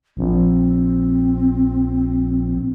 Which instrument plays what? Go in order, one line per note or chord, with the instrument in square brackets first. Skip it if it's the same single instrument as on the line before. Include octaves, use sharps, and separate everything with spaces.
[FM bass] A#1 [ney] C4